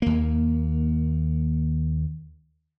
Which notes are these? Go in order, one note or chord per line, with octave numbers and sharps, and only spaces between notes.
D#2 A#3